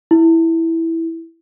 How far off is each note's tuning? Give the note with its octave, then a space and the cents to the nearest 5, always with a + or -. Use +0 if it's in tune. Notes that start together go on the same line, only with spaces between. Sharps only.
E4 -5